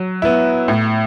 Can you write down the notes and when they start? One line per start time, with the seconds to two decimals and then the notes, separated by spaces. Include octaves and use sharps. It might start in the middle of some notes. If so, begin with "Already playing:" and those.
Already playing: F#3
0.22 B3 E4
0.68 A2